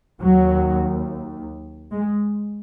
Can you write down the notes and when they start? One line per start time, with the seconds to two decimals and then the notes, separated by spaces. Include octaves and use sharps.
0.20 D#2 F#3
1.91 G#3